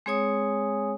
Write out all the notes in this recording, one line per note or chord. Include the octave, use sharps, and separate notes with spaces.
G#3 C4 G#4 C#5 G#5 D#6